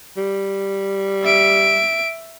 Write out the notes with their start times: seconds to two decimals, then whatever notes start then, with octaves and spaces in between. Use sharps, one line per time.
0.17 G3
1.24 E5 D7